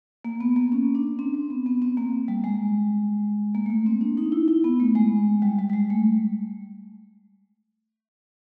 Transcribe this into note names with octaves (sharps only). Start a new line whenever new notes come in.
A#3
B3
A#3
C#4
D4
C4
C4
B3
B3
C4
A#3
G3
G#3
A#3
A3
A#3
C4
D4
D#4
E4
E4
B3
A3
G#3
G3
G3
G3
G#3
A3